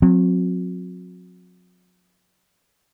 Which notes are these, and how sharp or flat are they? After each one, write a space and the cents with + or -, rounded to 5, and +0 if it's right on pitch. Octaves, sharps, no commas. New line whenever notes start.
F#3 -35 C4 +0